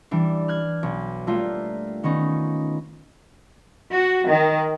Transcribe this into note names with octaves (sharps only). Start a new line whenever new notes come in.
E3 G3 D4
F6 F#6 G#6
B1
G3 A3 A#3 F4
D#3 B3 C#4 D#4
F#4
D#3